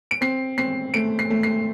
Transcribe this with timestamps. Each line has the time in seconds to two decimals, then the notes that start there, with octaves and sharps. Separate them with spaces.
0.11 D7
0.21 C4 C7
0.58 C4 C7
0.94 A3 D7
1.19 C7
1.30 A3
1.43 C7